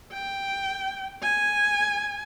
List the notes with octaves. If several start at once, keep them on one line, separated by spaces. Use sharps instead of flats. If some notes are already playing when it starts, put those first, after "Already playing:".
G5
G#5